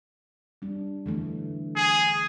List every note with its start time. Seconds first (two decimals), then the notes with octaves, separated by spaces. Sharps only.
0.62 G3 D4
1.06 D3 E3 A3
1.76 G#4